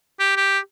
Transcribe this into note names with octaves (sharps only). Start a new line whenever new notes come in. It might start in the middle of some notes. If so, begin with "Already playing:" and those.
G4
G4